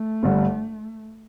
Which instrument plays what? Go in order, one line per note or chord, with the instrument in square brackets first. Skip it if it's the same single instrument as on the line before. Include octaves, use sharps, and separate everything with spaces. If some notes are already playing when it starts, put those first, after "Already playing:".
Already playing: [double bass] A3
[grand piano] G1 G2 D3 G3